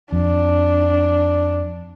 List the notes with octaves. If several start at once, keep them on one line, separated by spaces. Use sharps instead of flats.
F2 D4